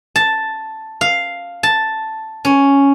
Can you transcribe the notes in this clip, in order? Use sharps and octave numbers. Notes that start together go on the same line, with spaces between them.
A5
F5
A5
C#4